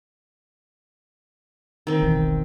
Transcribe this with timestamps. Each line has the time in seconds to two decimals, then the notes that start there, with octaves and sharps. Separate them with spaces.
1.87 D#3 C4
2.02 E1 B1 E3